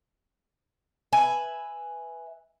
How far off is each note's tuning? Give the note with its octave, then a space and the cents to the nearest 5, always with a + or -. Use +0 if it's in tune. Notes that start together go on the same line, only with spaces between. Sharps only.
B4 +0 E5 +0 G#5 +0